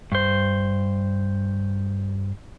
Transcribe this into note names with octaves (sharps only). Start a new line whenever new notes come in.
G2 C5